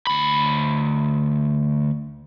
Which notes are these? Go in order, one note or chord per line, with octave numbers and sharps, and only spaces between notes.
D2 B5